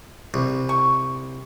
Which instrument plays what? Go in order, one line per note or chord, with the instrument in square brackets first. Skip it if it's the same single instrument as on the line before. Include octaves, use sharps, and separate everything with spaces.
[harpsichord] C2
[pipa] C#6